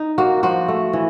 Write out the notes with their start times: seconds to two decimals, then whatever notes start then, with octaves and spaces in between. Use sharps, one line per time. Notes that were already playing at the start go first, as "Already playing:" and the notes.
Already playing: D#4
0.18 A#3 F#4
0.43 F3 F#4
0.68 A3
0.93 E3